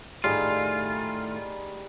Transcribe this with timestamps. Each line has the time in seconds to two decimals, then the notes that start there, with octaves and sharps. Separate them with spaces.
0.24 A2 D#3 G3 A3 D#4 F4 G#4